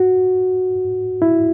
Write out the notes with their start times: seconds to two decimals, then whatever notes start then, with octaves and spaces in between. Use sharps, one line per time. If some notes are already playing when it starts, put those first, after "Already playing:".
Already playing: F#4
1.22 E4